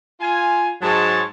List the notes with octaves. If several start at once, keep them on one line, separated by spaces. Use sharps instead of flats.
F4 G#5
G#2 F#3 G#3 C#5 A5